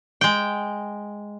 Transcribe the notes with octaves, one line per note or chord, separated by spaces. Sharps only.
G#3 G5